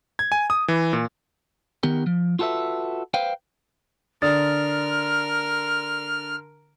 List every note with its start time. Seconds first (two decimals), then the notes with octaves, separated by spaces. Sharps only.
0.19 G#6
0.32 G#5
0.50 D#6
0.68 E3
0.93 A#2
1.83 D#3 B3 G4 A#4
2.07 F3
2.39 F4 F#4 A4 B4 E5
3.14 B4 C5 F5 G5
4.22 D3 A#4 D5 D#6 F6 A6